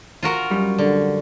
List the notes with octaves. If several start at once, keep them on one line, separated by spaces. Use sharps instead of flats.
F4 F#4 A#4
F#2 G3
D3